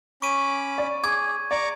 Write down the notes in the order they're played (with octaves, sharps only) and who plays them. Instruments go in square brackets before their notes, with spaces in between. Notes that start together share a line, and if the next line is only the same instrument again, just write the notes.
[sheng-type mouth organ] C#4 B5 D6 [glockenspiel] C#6 D#7
[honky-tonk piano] D5
[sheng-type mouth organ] G#4 [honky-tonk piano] D6 [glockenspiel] G#6
[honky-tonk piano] D5 [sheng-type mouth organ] A#5 C#6 D6